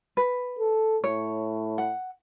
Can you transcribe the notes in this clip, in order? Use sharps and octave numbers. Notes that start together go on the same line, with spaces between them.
B4
A4
A2 C#5
F#5